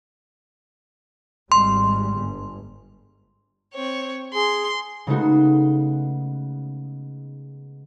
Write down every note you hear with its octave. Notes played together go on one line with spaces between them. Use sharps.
G#1 G3 G#3 C6
G1
C4 C#5
G#4 C6
C#3 G#3 A3 B3 D#4 F#4